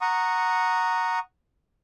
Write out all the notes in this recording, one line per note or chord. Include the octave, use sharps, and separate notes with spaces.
F#5 A#5 C#6 D#6